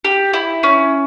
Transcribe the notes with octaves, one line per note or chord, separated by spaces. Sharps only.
G4
E4
C#4